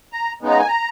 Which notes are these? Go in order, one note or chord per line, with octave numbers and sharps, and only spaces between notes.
A#5
C#3 G#3 B3 D#4
A#5
G#5
A#5